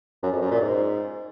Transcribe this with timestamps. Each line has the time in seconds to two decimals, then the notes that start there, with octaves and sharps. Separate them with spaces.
0.23 F#2
0.32 F2
0.41 F#2
0.51 A#2
0.60 G#2